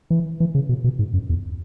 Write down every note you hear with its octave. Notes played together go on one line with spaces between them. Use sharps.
E3
E3
C#3
B2
B2
G#2
F#2
E2